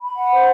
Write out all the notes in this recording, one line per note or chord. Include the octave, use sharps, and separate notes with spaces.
B5
F#5
C5